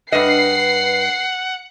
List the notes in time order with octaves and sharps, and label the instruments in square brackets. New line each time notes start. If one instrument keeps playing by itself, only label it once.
[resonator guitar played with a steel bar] G2 D#5 [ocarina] B4 [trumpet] F#5 [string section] C7